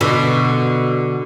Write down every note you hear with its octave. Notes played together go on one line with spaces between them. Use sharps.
B2 D3